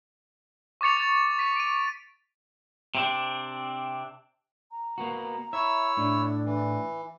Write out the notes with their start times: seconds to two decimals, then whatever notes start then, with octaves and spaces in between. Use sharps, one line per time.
0.81 C#6 D6 A6 C#7 F7
0.97 A6
1.39 B6 D#7
1.56 D7 D#7
2.95 C3 C4 D4
4.71 A#5
4.98 A#3 B3 F#4
5.53 E4 C#5 E5 E6
5.97 A2 D4
6.45 E3